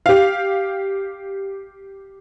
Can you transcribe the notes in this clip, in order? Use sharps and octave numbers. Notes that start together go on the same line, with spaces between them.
G4 F5